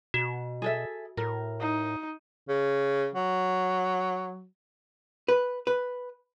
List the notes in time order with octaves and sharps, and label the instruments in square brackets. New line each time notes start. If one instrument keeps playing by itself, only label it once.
[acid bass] B2 [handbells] F#4
[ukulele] G#4 A4 E5
[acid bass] A2 [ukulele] A#4
[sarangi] D#4
[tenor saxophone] C#3
F#3
[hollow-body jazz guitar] B4
B4